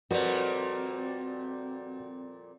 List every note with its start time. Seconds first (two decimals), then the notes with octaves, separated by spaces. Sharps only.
0.11 F2 A#2 G3 C4 F#4 A#4 B4 D5